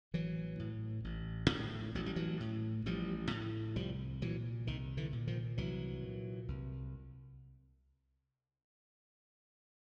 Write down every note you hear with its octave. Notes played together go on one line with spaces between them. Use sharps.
A1 E3 F#3
A2
A1
A2
A1 F#3
G3
E3 F#3
A2
A1 F3 G3
A2
C2 F3 G3
A#2 E3 F#3
C2 D#3
D3 E3
A#2
D#3 F3
C2 E3 F#3
A#2
C2